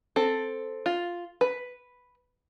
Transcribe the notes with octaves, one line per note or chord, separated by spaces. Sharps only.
C4 A4
F4
B4